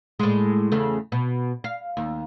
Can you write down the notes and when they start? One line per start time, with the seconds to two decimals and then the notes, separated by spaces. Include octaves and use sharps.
0.19 A2 G#3
0.72 E2 C#3 A3
1.12 B2
1.64 F5
1.97 D#2